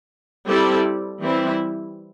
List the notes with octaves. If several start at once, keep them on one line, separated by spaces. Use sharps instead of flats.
G3 C4 E4 A4 D5
E3 G3 C4 E4